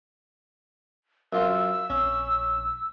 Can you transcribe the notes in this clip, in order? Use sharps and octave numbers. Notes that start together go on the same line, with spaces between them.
F#2 F4 C6 E6
A#1 C#4